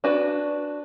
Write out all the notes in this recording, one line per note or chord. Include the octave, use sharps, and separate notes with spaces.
D4 F#4 B4